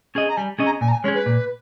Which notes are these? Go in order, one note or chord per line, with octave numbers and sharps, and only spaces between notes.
C#4 G#4 D#5
A#5
G3 G#5
C#4 G#4 D#5
A#5
A#2 G#5
A#5
G#5
G#3 C#4 G#4 C#5
B4
A#2